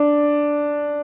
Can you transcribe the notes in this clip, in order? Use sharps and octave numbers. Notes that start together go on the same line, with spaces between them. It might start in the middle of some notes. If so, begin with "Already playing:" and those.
Already playing: D4